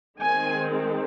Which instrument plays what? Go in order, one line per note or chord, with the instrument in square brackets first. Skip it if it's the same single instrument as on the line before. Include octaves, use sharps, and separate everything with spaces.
[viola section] D#3 G#3 C4 G#5